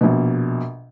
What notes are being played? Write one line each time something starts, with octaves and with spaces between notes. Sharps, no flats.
A#1 B2